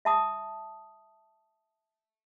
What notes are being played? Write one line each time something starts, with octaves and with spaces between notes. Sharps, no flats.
E5 A5 D#6